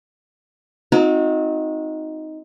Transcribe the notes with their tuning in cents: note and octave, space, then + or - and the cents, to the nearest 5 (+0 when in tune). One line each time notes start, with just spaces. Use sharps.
C4 -15 D#4 +10 F#4 -35